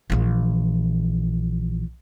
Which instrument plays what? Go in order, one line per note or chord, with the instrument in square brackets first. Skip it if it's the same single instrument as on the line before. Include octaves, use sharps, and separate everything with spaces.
[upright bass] A#1 E3